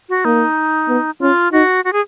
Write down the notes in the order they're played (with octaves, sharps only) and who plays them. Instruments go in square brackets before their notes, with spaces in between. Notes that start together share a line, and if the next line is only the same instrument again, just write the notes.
[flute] F#4
[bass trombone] A#3 [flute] D#4
[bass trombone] B3
[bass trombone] C#4 [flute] F4
[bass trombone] D#4 [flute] F#4
[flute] F#4
G#4